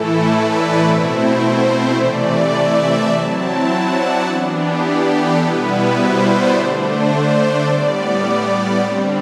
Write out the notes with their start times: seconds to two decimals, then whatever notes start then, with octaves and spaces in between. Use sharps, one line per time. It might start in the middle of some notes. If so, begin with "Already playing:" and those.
Already playing: A2 E3 A3 E4 A4
0.23 B4
0.51 D5
0.79 B2 A3 C4 E4 B5
1.08 C5
1.37 C5
1.93 C3 E3 A3 D5
2.51 E5
3.08 F#3 C4 E4 A5
3.66 F#5
3.94 D5
4.22 E3 B3 D4 F#4
4.51 G4
4.80 G4
5.09 A4
5.37 B2 G3 B3 E4 B4
5.94 C5
6.23 D5
6.50 D3 A3 D4 C5
6.80 C5
7.37 D5
7.66 A2 G3 B3 D5
8.79 D3 G3 C4 C5